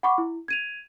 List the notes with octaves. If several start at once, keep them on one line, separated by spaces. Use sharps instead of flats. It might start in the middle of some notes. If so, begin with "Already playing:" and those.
F#5 B5 C#6 D6
E4
G#6 D#7 F7